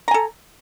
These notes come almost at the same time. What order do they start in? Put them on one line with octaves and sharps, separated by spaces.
A#5 G#5 A4